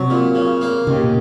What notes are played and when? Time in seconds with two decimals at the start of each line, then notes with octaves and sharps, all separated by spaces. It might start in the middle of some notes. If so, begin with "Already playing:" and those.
Already playing: C3 F#3
0.10 A#2
0.35 C#3
0.61 A#3
0.87 D#2 C#3
1.03 A#2